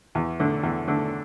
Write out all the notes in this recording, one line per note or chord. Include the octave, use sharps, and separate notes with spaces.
E2
D3 A3 D4
E2
D3 A3 D4